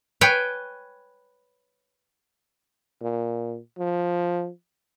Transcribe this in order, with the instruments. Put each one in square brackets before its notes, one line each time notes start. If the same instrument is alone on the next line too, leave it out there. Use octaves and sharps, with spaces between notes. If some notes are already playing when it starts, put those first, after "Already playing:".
[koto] B4 C#5 G5 G#5
[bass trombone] A#2
F3